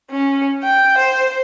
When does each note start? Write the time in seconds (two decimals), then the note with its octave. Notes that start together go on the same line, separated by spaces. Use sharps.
0.11 C#4
0.63 G5
0.98 C5